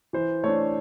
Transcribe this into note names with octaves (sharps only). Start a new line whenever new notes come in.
E3 C5
A3 D4 C#5